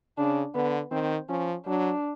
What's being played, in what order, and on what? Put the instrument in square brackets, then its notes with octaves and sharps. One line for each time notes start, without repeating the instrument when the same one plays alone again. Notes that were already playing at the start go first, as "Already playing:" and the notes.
[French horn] C#3 [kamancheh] D4
[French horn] D3 [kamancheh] B3
[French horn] D#3 [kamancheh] C4
[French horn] F3 [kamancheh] C#4
[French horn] F#3 [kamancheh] D4